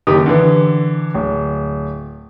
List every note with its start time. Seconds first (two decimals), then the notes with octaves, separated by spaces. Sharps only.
0.07 F#1 D#3 G4 D#6
0.26 D3 E3
1.14 D1